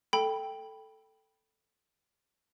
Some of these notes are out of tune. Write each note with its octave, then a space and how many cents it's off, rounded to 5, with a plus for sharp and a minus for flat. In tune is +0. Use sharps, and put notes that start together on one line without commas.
A4 +0 G5 +0 B5 -5